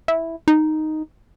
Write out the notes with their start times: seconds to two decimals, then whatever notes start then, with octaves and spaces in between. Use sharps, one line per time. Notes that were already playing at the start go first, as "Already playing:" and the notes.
0.08 E4
0.48 D#4